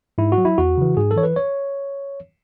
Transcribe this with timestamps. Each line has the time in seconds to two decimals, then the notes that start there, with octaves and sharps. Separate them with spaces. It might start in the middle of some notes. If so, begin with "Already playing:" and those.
0.18 G#2 E4
0.32 F#4
0.38 F#3
0.45 E4
0.58 E2 F#4
0.78 C#3 E3
0.97 G#2 G#4
1.11 A4
1.16 E3 C#5
1.23 B4
1.36 C#5